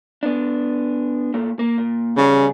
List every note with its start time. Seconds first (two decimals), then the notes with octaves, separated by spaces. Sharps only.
0.23 B3 D4
1.34 A#2 A3
1.59 A#3
1.78 A#2
2.17 E2 C#3 G3 G#4